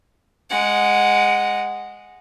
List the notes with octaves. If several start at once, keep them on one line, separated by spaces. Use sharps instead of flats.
G#3 F#5